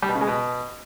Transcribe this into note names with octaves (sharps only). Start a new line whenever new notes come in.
G3
B2
C#3
G#3
B2